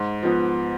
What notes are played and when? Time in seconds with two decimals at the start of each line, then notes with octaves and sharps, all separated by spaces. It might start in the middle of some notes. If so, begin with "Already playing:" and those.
Already playing: G#2
0.23 F3 B3